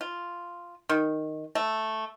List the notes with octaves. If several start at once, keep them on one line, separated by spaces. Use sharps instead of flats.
F4
D#3
A3